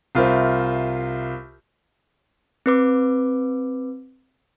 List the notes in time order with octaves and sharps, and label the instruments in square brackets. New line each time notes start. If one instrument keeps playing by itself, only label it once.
[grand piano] C2 F4 A#4 C5 E5
[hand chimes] C4 B4 D6